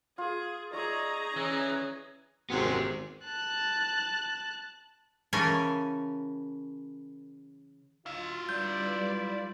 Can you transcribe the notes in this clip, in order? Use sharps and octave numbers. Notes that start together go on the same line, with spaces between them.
F4 G#4
D#4 G#4 D5 E5 A#5 C#6
E3 C#4
G#1 F#2 C3 B3 G#4
A5 F#6
C#3 E3 C#4 A4 A#4 G#5
E4 F4 F5
G3 B4 D5 G6